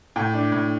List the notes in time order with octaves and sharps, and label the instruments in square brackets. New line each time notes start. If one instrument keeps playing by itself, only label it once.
[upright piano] A2 G5
D4
A2